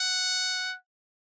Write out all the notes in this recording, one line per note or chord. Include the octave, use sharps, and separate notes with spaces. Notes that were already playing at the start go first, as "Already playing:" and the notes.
Already playing: F#5